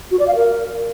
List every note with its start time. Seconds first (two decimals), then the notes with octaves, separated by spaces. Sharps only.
0.11 F#4
0.19 D5
0.27 F5
0.35 A#4